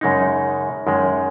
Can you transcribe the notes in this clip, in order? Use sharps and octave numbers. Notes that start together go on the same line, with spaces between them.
F#2 C#3 G#3 D#4
F#2 D#3 G#3